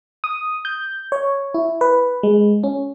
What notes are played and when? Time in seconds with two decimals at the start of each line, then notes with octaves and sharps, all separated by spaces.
0.24 D#6
0.65 G6
1.12 C#5
1.54 E4
1.81 B4
2.23 G#3
2.64 C#4